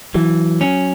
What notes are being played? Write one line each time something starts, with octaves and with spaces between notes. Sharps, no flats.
E3 F#3
C#4